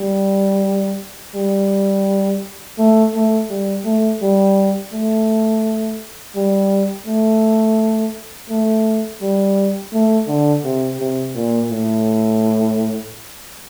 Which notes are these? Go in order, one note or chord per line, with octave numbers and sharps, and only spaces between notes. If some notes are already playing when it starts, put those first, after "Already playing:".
Already playing: G3
G3
A3
A3
G3
A3
G3
A3
G3
A3
A3
G3
A3
D3
C3
C3
A#2
A2